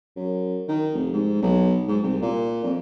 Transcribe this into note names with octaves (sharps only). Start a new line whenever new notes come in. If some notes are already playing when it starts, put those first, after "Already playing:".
F#2
D#3
F1
G#2
B1
G#2
C2
A#2
F2